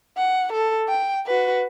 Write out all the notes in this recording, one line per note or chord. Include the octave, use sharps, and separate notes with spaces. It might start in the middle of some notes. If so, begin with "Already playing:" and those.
F#5
A4
G5
F#4 B4